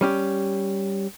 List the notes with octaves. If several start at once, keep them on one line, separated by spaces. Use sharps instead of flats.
G3 C#4 G4